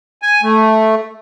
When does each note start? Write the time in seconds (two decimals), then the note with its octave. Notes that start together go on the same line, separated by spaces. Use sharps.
0.22 G#5
0.43 A3